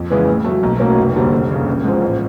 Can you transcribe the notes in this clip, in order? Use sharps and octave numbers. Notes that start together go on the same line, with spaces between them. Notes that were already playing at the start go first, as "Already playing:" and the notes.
Already playing: F2
C#3 E3 G#3 B3
A2
F#3 A3
B1
A2 F#3 A#3 C#4
F1
D#2 D3 G3 C4
F1
D#2 C#3
A1
G#2 F3 G#3 C4
A1